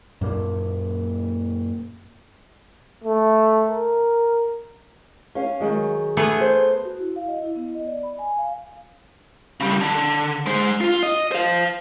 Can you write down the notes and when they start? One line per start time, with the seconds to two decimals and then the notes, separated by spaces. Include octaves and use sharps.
0.21 F#2 A#2 A#3
3.04 A3
3.70 A#4
5.35 C#4 F5
5.60 D#3 F#3 G#3
6.17 A3 B3 G#4
6.40 C5
6.85 F#4
6.99 E4
7.16 F5
7.28 D#5
7.42 E4
7.56 B3
7.75 D#5
7.87 D5
8.03 B5
8.19 G#5
8.38 F5
9.60 C#3 G3
9.81 D3
10.46 G#3 C5
10.81 F4
11.03 D#5
11.32 C5 F5